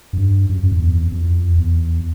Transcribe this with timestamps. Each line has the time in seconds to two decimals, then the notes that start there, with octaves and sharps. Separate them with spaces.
0.13 F#2
0.18 G2
0.50 F#2
0.63 F#2
0.72 F2
0.80 E2
1.12 F2
1.58 E2